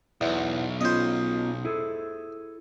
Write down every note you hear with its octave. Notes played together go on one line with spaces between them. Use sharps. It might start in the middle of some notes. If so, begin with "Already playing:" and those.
B1 E2
B3 C#4 F4 C5 D#5
E4 G#4 A4